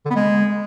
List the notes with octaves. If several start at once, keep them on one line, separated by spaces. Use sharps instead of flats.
D3
B3
G#3